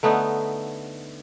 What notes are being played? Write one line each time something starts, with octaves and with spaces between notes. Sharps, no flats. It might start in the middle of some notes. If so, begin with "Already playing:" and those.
D3 A3 B3 D#4